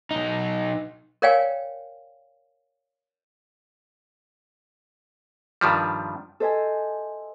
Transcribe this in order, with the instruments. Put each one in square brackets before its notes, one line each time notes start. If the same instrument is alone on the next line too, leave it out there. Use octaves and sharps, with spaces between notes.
[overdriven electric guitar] B1 D#4
[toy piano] A#4 C#5 D5 F5 G5 G#5
[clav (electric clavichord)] G2 D#3 F3 G3
[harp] A4 C5 D#5 E5 G#5